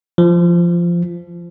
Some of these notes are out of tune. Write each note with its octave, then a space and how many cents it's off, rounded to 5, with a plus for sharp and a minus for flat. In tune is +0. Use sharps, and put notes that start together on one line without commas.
F3 -15